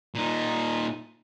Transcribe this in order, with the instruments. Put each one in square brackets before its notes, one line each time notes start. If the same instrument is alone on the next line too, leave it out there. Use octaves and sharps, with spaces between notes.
[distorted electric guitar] A#2 D#4